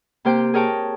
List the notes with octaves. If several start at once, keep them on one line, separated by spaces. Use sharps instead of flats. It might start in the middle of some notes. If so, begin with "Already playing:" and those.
C3 A#3 G4 C5 G5 G6
G#4 A#4 C#5 G5 A5